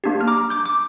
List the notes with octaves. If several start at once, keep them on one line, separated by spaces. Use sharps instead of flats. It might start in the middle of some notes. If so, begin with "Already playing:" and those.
A#3 D4 G4
F6
A#5 D6
D6 G6
D6